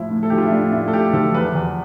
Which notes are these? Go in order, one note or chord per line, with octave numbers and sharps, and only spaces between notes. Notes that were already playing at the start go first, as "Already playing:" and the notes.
Already playing: A2 F3 E4
A2
A4
F3 G4
F4
E4
A2 D4
A2 E4
A4
A2 G4
F3 A4
E2 B4
E2